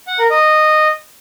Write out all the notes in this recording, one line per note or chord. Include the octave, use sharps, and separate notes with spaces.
F#5
A#4
D#5